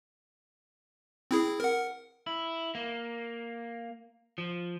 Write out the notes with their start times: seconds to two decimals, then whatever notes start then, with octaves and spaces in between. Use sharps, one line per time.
1.31 C4 E4 G#4
1.60 A#4 F#5
2.27 E4
2.75 A#3
4.38 F3